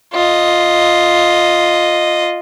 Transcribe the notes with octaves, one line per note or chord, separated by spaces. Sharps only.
F4 D#5